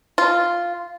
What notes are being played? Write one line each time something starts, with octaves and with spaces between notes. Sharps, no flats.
F4